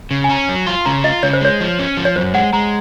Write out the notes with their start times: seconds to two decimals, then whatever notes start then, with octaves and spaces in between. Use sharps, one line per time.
0.11 C#3
0.24 G#5
0.29 C#4 A#5
0.49 F#3
0.67 F4 C6
0.81 C6
0.85 C#3 A#5
1.04 F4 D#5
1.23 C#3 C#5
1.33 C5
1.41 G#3 C#5
1.61 F3
1.79 C#4
1.97 F3
2.05 C#5
2.16 F#2 C5
2.34 G#3 F#5
2.53 G#3 A#5